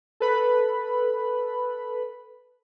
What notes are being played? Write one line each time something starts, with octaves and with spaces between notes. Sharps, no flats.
A4 B4 B5